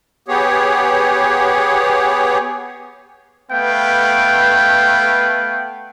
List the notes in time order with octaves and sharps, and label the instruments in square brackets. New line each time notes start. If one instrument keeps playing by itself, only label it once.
[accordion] B3 G4 G#4 C#5
[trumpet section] A3 B3 B4 F5 G5